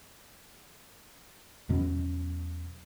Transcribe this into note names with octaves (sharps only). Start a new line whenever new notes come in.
E2 B2 F#3 C#4